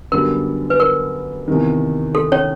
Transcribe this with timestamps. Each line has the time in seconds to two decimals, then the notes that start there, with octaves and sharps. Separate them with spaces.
0.12 F#2 D3 G3 B3 A#4
0.70 B4
0.80 A#4
1.48 E2 C3 D#3
2.15 A4
2.32 C#4 C#5